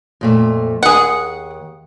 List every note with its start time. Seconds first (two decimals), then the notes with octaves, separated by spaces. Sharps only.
0.21 F2 A#2 A3
0.83 D#2 G#4 F#5